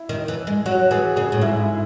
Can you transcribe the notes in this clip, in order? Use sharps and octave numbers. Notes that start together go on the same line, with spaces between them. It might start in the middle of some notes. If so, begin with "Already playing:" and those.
Already playing: E4
D#3
E3
G#3
F#3 F#4
E3 G#4
C#3 G#4
A2
G#2 E4
E4